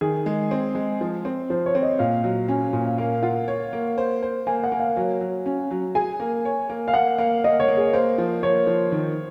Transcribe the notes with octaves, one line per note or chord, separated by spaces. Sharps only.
D#3 G#4
G#3
C4
G#3
F3
C4
F3 C5
C#5
C4
D#5
A#2 F5
F#3
C#4 G#5
A#2
F5
A#3 F5
F4 F#5
C#5
A#3
C5
C5
A#3 G#5
F#5
A#3
F5
F#3 C#5
F#3
C#4
F#3
G#4 G#5
A#3
C#5
A#3
F5
A#3 F#5
A#3 F5
A#3 D#5
C#5
A#3
G#4
A#3 C5
F3
A#3 C#5
F3
D#3